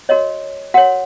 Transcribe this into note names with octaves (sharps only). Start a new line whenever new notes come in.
F#4 A#4 C#5 D#5
F#4 A#4 C#5 F#5